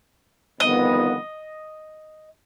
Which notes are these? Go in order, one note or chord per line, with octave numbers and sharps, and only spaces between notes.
G1 F2 D#3 B3 D#5